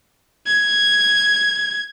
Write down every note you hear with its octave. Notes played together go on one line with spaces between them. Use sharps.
G#6